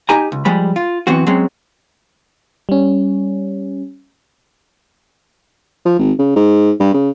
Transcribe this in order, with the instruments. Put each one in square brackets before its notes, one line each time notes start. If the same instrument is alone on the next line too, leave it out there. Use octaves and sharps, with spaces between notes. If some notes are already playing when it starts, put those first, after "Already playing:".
[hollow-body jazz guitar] D#4 G4 G#5 A#5
C#2
F3 G3 G#3 B5
F4
F#2 E3 B3 C4 F#4
F#3 G#3 C4 C#4
[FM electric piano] G3 C#4
[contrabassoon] F3
G#1
C#3
G#2
G2
C#3